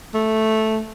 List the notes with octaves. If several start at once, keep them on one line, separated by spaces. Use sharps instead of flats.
A3